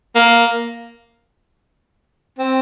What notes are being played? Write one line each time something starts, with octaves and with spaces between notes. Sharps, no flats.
A#3
C4